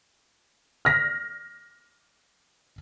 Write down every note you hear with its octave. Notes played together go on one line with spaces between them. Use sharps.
F6 A#6 B6